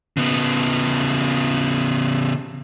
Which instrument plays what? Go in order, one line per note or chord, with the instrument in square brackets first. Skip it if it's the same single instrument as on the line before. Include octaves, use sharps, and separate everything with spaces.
[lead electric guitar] C#3 B3